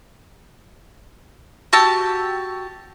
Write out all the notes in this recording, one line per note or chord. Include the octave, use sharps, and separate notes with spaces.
F#4 G4 A5 E6